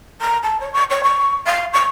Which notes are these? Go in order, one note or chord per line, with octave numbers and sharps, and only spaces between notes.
A#5
A5
C#5
C#6
C#5
C#6
F5
C#6